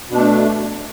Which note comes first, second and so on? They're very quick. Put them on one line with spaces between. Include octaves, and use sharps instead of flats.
B2 D4 A3